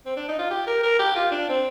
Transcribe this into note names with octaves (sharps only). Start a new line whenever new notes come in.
C4
D4
D#4
F4
G4
A#4
A#4
G4
F4
D4
C4